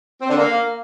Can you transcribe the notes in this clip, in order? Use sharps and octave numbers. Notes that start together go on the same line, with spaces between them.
C4
D3
A#3